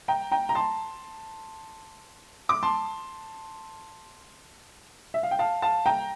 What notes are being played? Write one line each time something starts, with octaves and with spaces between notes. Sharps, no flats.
G5 A#5
G5 A#5
A#5
A5 C6
D6
A5 C6
E5
F5
G5
F5 A5
F5 A5
G5 A#5